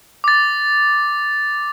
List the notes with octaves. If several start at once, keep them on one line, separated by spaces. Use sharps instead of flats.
D6 A6